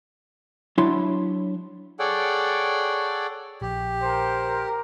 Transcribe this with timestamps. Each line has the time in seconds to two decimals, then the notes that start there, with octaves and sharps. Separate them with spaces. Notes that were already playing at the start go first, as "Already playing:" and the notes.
0.78 F#3 D4 E4 C#5 A5 C6
1.99 G#4 A4 C#5 D5 F#5 G5
3.62 A#1 G4
4.02 A#4 C5